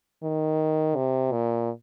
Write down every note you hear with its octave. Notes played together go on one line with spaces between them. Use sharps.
D#3
C3
A#2